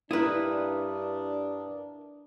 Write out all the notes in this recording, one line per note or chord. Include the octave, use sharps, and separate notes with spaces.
G2 D4 E4 A#4 B4 D#6